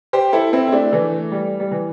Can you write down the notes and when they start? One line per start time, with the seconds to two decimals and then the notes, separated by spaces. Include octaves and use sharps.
0.13 G4 C5
0.33 E4 A4
0.53 C4 E4
0.68 E4
0.72 A3 D4
0.92 E3 A3
1.32 G3
1.60 G3
1.71 E3